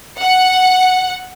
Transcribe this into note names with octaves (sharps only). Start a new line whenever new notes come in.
F#5